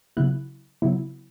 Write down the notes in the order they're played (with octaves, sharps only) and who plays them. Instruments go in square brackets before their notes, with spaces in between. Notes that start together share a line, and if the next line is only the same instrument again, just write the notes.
[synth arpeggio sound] C#3 F#3 B3 E4 F#6
C#3 F#3 B3 E4